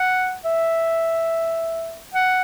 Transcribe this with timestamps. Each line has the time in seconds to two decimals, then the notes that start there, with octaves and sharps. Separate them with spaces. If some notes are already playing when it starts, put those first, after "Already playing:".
Already playing: F#5
0.45 E5
2.14 F#5